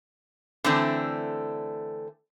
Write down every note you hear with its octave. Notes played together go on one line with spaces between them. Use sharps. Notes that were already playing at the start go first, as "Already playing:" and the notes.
D3 E3 A3 C4 D4